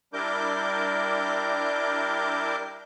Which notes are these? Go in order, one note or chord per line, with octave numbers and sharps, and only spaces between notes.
G3 D4 E4 A#4 D6 G6